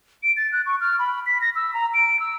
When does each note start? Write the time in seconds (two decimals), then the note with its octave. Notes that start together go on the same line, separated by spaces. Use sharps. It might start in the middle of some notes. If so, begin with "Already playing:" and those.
0.23 D7
0.37 A6
0.52 F#6
0.66 C#6
0.80 F6
0.99 B5
1.26 B6
1.41 A#6
1.55 E6
1.74 A#5
1.94 D7
2.19 E6